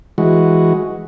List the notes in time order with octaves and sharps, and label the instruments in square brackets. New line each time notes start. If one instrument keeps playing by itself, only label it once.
[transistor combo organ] E3 G#3 F#4